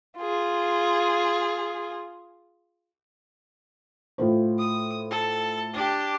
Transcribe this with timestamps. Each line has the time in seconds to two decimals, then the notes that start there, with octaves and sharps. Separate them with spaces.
0.18 F4 G#4
4.18 A2 F4 C5
4.59 D#6
5.11 A4
5.74 D4 G4